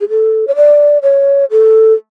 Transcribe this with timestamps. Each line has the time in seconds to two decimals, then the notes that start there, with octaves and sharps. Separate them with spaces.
0.01 G#4
0.09 A4
0.48 C#5
0.56 D5
1.03 C#5
1.51 A4